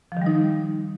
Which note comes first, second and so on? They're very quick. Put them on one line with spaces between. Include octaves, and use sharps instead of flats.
F3 D#3 G3 D#4